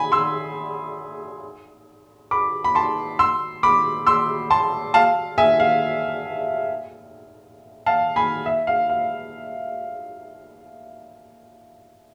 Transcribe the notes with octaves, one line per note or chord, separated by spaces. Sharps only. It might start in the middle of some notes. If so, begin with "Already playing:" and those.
Already playing: G#5 B5
C6 E6
B5 D6
B5
A5 C6
C6 E6
B5 D6
C6 E6
A5 C6
F5 A5
E5 G#5
F5
F5 A5
G#5 B5
E5
F5
F5